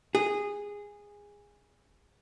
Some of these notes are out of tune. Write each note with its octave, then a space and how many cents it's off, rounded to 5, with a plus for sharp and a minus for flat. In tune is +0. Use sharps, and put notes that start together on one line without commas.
G#4 -15